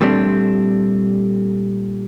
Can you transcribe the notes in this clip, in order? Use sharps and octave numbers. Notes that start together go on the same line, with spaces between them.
A#2 G3 A3 C4 D4